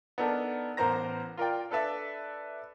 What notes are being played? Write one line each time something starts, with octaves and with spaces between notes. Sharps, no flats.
B3 D4 D#4 A4 A#4
A1 B3 A#4 C5 A#5 A#6
F4 A#4 D5 G5
D4 A4 B4 D5 E5